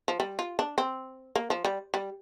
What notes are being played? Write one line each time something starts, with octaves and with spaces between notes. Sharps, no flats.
F3
G3
F4
D4
C4
A#3
F3
G3
G3